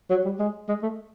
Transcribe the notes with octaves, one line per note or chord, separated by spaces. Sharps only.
F#3
G3
G#3
G#3
A3